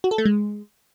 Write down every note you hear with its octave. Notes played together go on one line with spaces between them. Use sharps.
F#4
A4
A3
G#3